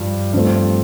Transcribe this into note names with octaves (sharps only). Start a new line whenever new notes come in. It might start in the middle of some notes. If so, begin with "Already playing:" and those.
Already playing: G2 F3
G2 F3 A3 C4